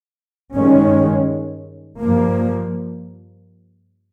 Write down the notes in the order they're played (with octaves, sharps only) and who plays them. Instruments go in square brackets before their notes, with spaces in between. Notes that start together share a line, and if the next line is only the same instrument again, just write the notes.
[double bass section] G2 D#3 G#3 C#4
G2 F3 A#3